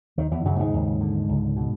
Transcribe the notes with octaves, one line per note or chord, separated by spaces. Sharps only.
D#2 D#3
E2 E3
F#2 C#3 F#3
G#2 G#3
D#2
D3
C#2
B2